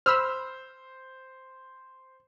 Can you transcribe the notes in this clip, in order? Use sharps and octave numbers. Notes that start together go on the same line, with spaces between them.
C5 B5 E6 F6